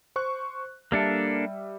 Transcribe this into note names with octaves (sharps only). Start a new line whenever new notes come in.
C5 C#6 F#6
G3 A#3 D4 A4 E5